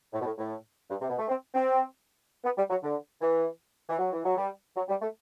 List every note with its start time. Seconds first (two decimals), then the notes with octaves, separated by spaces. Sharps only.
0.13 A2
0.21 B2
0.25 A2
0.38 A2
0.90 G2
1.01 C3
1.09 B2
1.19 A3
1.28 C4
1.55 C4
2.44 B3
2.57 G3
2.70 F#3
2.83 D3
3.22 E3
3.89 E3
3.99 F#3
4.13 E3
4.25 F#3
4.37 G3
4.76 F#3
4.89 G3
5.02 A3